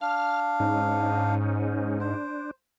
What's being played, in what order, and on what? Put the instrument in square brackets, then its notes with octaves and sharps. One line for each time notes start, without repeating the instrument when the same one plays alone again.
[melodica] D4 F5 [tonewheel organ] F6
[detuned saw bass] G#2 [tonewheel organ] C#4 D#4
[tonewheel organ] D4 [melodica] C5